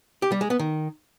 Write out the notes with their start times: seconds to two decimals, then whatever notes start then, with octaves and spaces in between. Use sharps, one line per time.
0.22 G4
0.32 G3
0.41 G#3
0.50 B3
0.59 D#3